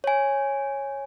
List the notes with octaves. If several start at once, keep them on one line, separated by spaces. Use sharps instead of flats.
C#5 G#5